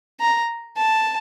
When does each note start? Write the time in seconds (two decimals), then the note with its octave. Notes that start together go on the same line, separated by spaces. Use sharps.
0.20 A#5
0.76 A5